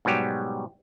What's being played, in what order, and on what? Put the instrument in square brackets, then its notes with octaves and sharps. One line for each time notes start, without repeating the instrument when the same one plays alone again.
[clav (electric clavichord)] G#2 B2 F#3 G3 G4